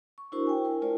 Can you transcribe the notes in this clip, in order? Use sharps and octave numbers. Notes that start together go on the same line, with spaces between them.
C#6
D4 E4 F#4 A#4 C5 C#6
G5 G#5
E4 A#4
A3 E4 F4 A#4 C5 D5